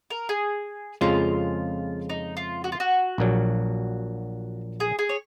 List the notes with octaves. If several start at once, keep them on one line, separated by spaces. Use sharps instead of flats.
A#4
G#4
F2 C#3 F3 G#3 F4
D#4
F4
F#4
F4
F#4
A#1 A#2 F#3
G#4
G#4
C#5